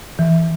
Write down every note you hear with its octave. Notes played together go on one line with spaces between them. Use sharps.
E3